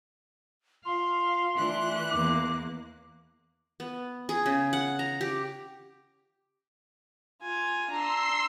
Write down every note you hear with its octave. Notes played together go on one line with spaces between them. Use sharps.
F4 F5 C6
E3 A3 D4 F#6
E2 A#3 D6
B3
G#4
C#3
F#5
A#5
G4
F4 G#5
D4 A#5 C6 E6 C7